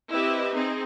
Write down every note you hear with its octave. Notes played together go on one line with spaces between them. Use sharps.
C4 E4 G4 B4 D#5 E5
C4 D#4 G#4